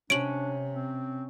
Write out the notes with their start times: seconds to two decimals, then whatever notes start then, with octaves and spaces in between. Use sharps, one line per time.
0.10 C3 C#4 D4 D7 F#7
0.72 C4